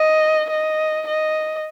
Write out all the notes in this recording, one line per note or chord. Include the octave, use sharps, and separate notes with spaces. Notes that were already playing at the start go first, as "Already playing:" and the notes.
Already playing: D#5
D#5
D#5